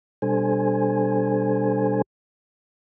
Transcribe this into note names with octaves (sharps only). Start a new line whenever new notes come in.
B2 G3 D4 A4 C5 G#5